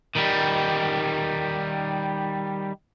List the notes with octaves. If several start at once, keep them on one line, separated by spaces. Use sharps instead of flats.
D#3 G3